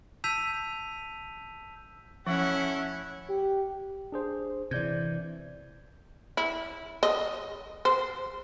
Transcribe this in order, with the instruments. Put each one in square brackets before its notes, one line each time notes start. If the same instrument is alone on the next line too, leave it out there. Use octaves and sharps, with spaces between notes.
[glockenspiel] A5 E6 G6 B6 D#7 F7
[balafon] F3 [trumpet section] A3 E4 F#5 [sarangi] C#4
[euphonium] G4
[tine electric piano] D4 G#4 C5
[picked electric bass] C3 E3 [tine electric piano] D5 G6 G#6
[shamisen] E4
D#5
C5